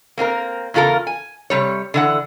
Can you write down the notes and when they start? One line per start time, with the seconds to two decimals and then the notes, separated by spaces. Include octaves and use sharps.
0.18 A#3 C4 F4 A#4
0.74 E2 C#3 F4 A4 A#4
1.07 G#5
1.50 C3 G3 C#5
1.94 D3 E3 F#5